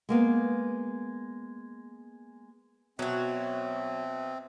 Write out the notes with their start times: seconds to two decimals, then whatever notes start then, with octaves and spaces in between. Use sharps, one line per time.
0.09 G#3 A#3 B3
2.99 B2 F#3 C4 F#4 E5